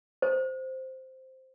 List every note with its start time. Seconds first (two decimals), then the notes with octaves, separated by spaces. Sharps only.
0.22 C5